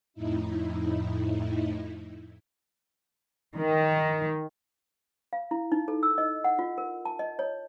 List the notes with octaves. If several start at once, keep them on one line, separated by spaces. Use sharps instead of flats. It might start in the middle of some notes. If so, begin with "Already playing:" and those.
F2 A2 D#4 E4
D#3
F5
E4
D#4
A4
E6
D#5
F#5
F4
A#4
A5
D#5
C#5